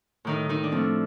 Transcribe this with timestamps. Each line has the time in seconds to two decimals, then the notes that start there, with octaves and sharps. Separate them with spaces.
0.25 A2 D#3 D#4
0.49 D#3 D#4
0.63 D4
0.72 F3 A3 C4